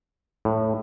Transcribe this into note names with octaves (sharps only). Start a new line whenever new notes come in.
A2